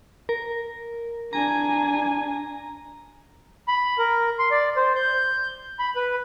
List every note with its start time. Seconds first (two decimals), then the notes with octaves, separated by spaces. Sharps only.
0.29 A#4
1.33 D4 G#5 A#5
3.68 B5
3.98 A#4
4.39 C6
4.51 D5
4.76 C5
4.96 G6
5.79 B5
5.96 B4